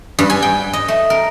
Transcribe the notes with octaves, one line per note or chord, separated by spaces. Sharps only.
G2
G#5
G5
D#5
A3
A#4